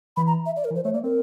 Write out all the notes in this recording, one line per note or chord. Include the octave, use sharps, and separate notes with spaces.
E3 B5
A#5
E5
D5
A#4
E3
F3 C5
A3 C#5
A#3 D5
C4 A#4